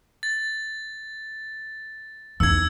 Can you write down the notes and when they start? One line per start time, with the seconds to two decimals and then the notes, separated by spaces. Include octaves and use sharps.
0.23 A6
2.40 E2 D#4 E6 G#6